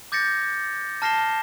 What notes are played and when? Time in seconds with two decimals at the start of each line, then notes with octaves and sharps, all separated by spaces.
0.12 D6 G6 A6 A#6 C#7
1.02 A5 F6 A#6 C7 E7 G7